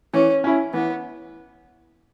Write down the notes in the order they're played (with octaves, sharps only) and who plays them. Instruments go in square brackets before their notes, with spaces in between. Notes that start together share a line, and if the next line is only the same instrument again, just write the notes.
[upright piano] E3 [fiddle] C#4
[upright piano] C#4 E4
[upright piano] E3 [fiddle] B3